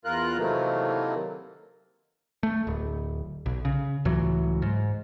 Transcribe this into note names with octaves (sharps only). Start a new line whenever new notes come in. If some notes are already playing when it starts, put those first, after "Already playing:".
E2 F4 A#4 F#6
C3 D#3 E3 F#3 A3 A#3
A3
D1
B1
C#3
C#2 A2 E3 F#3
G#2